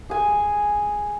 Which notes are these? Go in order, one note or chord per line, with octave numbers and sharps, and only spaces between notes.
G#4 G#5